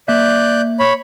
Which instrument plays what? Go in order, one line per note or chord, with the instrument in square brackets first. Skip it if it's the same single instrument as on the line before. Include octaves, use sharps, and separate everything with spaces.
[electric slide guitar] A#3 E5 [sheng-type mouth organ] D5 F#6 G6
[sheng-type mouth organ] C#5 B5